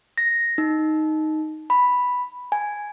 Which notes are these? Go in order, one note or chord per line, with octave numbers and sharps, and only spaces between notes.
A#6
D#4
B5
G#5